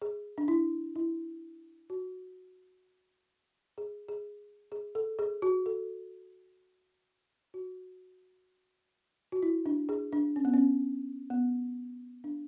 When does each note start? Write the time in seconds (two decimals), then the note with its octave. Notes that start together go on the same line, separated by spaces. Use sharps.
0.02 G#4
0.38 D4
0.48 E4
0.96 E4
1.90 F#4
3.78 G#4
4.08 G#4
4.72 G#4
4.95 A4
5.19 G#4
5.42 F#4
5.66 A4
7.54 F#4
9.32 F#4
9.43 E4
9.66 D4
9.89 G#4
10.12 D4
10.36 C#4
10.45 B3
10.54 C#4
11.30 B3
12.24 D4